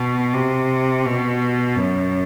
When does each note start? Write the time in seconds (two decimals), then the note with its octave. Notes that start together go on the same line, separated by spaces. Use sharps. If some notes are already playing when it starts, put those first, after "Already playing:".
Already playing: B2
0.34 C3
1.05 B2
1.75 F#2